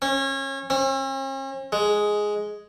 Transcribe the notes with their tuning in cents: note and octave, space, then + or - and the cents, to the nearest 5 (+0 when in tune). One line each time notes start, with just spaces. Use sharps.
C#4 -30
C#4 -45
G#3 +5